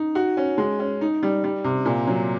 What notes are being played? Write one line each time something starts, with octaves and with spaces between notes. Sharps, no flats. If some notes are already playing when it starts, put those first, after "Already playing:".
Already playing: D#4
F#4
C#4
G#3
C#4
D#4
G3
G3
C3
A#2
F#3